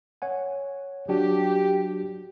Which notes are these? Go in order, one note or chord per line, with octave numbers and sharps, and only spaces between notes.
C#5 F#5 G#5
F#3 D4 F#4 G4